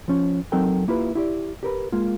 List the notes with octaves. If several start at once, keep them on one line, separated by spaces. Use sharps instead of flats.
F3 C#4
F#3 C4 D#4 A4 A#4 G5
A#3 E4 F4 G4 B4
E4 G4 D5
G4 A#4 B4
G#3 A#3 F4